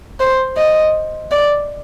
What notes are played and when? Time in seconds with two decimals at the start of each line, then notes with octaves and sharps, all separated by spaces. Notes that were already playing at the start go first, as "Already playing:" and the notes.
0.20 C5
0.57 D#5
1.32 D5